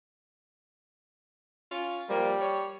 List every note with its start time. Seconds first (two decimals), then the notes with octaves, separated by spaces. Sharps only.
1.72 C#4 F4
2.09 F3 G3 A#3
2.41 C#5